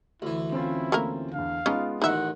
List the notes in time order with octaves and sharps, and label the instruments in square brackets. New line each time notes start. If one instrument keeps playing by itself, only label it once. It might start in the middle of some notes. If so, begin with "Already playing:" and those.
[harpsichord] D2 E3 [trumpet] E4
[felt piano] C4 C#4 F4 [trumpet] E4
[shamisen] A3 A#3 A#4
[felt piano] E2 D3 [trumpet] F5
[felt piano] G#3 B3 F4 [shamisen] C#4 D#4
[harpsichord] A1 D#3 [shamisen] D#4 E5 [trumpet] F#5